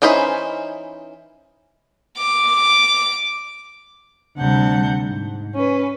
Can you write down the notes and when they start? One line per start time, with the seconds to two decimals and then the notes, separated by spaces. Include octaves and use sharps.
0.02 E3 C#4 D#4 C5 B5
2.18 D6
4.38 D2 C3 G3 F#5 A5 G6
5.06 G#2
5.55 C#4 B4